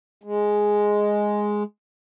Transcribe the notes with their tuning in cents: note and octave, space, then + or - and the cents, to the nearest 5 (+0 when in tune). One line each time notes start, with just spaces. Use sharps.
G#3 +0